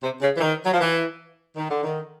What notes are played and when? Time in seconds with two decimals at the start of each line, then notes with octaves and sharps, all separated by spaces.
0.03 C3
0.22 C#3
0.37 E3
0.41 D#3
0.65 F#3
0.73 F3
0.81 E3
1.57 D#3
1.70 D3
1.84 D#3